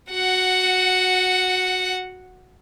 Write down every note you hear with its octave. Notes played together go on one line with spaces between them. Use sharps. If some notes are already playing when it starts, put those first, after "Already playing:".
F#4 F#5